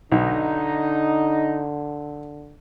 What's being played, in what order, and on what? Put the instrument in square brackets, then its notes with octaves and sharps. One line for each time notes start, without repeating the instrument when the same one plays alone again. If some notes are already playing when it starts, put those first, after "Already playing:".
[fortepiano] B1 [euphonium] D3 [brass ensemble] D#4